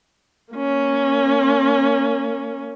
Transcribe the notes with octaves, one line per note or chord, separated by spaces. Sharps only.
A#3 C#4